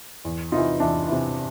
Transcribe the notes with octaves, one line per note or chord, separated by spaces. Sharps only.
E2
C3 E3 D#4 F4
E2 D4 E4
C3 E3